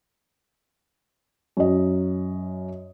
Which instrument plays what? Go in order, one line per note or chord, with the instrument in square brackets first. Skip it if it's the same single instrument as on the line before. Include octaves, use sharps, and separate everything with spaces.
[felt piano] F#2 D#5